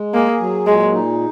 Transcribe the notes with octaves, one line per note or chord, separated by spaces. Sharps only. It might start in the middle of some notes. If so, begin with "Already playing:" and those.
Already playing: G#3
A#3 G#4
F#3
A#2 G#3
D#4